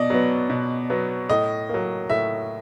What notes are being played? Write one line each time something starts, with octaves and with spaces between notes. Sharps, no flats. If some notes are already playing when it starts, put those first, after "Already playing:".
Already playing: B2 D5 D#5
F#3 B3
B2
F#3 B3
A2 D#5
F#3 A#3
A2 E5